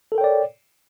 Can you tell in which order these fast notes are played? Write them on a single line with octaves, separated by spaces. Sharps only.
A4 A#4 G5 C#5 D5